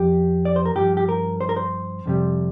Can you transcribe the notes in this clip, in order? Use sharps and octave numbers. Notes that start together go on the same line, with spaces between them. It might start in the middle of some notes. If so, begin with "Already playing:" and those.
Already playing: F2 F3 G4
D5
C5
A#4
G2 F3 G4
G4
A#4
C5
A#4
C5
F2 C3 G3